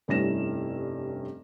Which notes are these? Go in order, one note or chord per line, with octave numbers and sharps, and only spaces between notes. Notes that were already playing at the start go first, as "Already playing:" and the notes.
F1 G2 C#4 E4 A#6 E7